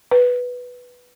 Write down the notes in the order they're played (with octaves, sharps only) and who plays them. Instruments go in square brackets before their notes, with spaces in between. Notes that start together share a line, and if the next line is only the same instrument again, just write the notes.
[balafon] B4